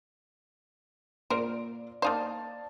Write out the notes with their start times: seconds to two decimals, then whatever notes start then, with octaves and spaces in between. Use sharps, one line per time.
1.30 A#2 A#4 C5 D5 D7
2.02 A#3 D#4 C5 D5 F5 A5